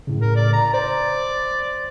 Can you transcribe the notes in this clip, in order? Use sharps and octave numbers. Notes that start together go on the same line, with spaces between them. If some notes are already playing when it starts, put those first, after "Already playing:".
A2 C#3
A#4
D5
A#5
C5 D5